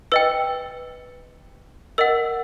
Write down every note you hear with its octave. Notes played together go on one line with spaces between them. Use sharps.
B4 D#5 G5 E6
A#4 D#5 F#5 E6